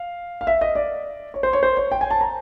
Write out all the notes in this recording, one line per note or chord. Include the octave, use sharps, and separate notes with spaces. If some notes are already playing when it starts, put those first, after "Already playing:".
Already playing: F5
F5
E5
D#5
D5
C#5
C5
C#5
C5
C#5
G5
G#5
A5
A#5